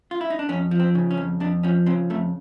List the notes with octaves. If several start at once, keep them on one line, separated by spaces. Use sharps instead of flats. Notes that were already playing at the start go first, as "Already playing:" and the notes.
F4
E4
D#4
D4
F2 C#4
F3
C4
C#3
C#4
F2
F2 D4
F3 C#4
C#3 C4
F2 A3